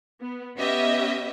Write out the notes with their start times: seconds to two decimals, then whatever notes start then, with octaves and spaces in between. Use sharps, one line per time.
0.21 B3
0.58 B3 C#4 G4 D#5 E5